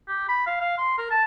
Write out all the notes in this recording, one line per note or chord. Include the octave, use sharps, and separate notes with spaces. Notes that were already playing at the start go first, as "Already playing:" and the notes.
G4
B5
F5
F5
C6
A#4
A5